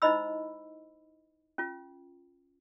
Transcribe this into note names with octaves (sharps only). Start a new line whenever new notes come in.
D#4 E4 C5 D#5 B5 E6
C#4 F4